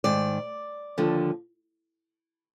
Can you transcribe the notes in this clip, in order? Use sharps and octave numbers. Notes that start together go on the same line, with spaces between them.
G#2 D#3 D5
D#2 D3 F3